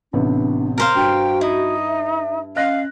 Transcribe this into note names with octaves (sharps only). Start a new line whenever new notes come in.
A1 C3 B3 D4
A#4 C5 F5
G2 F#4 G5
D#4 E4
E5
C#4 D#5 F5 F#6 A#6